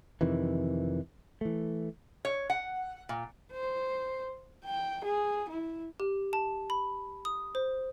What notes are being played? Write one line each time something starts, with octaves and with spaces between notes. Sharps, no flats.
F2 C3 D#3 E3
E3 A3
C#5
F#5
A#2
C5
G5
G#4
E4
G4
A5
B5
D#6
C5